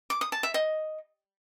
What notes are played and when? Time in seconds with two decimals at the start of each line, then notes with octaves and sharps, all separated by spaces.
0.10 D6
0.21 D#6
0.32 A5
0.43 E5
0.54 D#5